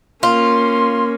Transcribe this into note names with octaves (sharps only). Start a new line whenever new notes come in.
A#3 C#4 F4 C6